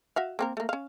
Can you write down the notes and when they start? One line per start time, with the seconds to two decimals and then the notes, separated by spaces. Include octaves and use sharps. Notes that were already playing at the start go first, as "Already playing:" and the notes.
0.16 F#4 E5 F5
0.39 A#3 C4 A#4
0.57 A3 A#3
0.69 C#4 F5